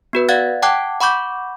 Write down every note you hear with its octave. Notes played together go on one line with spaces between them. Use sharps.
B3 F#4 B4
D5 F5 F#5 F#6 G#6 A6
F#5 G5 A5 D6 F#6 G#6
F#5 B5 C#6 D6 G6